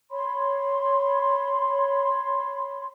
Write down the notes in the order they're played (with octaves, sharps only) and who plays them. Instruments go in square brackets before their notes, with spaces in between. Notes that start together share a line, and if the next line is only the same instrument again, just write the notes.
[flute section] C#5 B5 C6